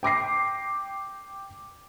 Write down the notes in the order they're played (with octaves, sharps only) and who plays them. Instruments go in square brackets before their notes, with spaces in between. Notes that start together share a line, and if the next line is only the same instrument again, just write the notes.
[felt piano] G5 D6 A#6 C7